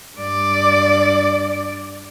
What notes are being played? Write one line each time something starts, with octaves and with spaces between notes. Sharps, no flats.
G2 D5